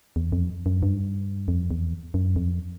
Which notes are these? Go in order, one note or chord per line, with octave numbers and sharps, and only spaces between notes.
E2
F2
F#2
G2
F2
E2
F#2
F2